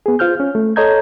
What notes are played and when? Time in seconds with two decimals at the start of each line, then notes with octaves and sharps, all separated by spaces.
0.06 B3 G#4
0.19 F4 C5 F6 G6
0.40 C#4
0.55 A3
0.76 A4 C#5 D#5 A#5 G6 G#6